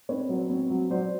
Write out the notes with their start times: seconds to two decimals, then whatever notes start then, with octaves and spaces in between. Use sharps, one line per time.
0.09 C4 B4 C#5
0.29 F#3
0.50 C4
0.70 F#3
0.90 F#3 C5 D5